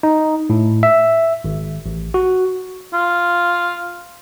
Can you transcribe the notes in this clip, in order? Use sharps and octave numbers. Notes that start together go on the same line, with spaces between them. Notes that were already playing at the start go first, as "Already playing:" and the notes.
D#4
A2
E5
G#1
A1
F#4
F4